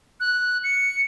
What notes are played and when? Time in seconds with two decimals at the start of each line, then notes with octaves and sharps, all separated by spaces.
0.20 F#6
0.64 C#7